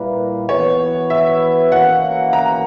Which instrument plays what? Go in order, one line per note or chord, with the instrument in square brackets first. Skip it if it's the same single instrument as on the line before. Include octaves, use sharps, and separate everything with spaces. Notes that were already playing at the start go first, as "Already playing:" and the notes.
Already playing: [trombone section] A#2 G3 A#3 E4 B4
[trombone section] E3 B3 F#4 B4 [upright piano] C#5
[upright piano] E5
[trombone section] E3 A#3 C#4 F#4 A#4 [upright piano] F#5
[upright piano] A#5